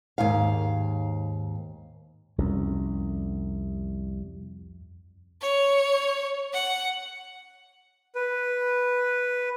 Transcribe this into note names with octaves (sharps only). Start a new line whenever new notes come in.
D#2 G#2 F5
C2 F2 C#4
C#5
F#5
B4